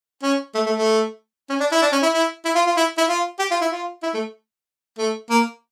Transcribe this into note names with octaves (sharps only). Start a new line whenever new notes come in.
C#4
A3
A3
A3
C#4
D4
E4
D4
C#4
E4
E4
E4
F4
F4
E4
E4
F4
G4
F4
E4
F4
E4
A3
A3
A#3